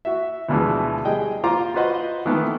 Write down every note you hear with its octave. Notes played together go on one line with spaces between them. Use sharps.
F#4 E5
D2 B2 E3 F3 G#3
G3 G#4 D#5 G5
F4 C5 A#5 C6 D6
F4 F#4 B4 C5 D#5 F#5
D#3 E3 A3 B3